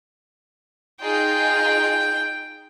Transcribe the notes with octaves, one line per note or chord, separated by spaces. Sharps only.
D#4 F4 G#4 G5